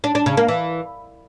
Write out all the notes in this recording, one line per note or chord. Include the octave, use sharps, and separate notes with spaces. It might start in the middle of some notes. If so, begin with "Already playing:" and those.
D4
D4
C#3
A#3
E3